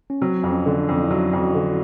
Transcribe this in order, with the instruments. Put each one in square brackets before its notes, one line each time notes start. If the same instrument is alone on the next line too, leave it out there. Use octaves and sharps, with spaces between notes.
[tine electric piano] C#4
[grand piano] F#3 [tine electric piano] C4
[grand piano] F2
[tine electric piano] C#4
[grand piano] D3
[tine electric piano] D4
[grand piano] F2
[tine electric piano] E4
[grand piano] F#3 [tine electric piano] F4
[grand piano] F2
[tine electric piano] F#4
[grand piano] D3